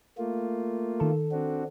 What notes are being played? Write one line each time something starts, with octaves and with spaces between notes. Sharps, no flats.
A3 A#3 F4
D#3 A4
C4 D4 F#4